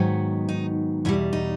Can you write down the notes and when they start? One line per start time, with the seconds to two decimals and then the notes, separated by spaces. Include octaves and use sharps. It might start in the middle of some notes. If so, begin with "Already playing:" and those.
Already playing: G#2 D#3 F#3 B3
0.49 D#4
1.05 E2 B2 G3 E4
1.33 D#4